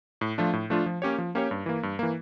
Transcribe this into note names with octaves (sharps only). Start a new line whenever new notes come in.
A2
F3 A3 D4 F4
A2
F3 A3 D4 F4
F3
A#3 C#4 G4 C#5
F3
A#3 C#4 G4 C#5
G2
E3 A#3
G2
E3 A#3